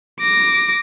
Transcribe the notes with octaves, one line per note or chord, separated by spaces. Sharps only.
D6 A#6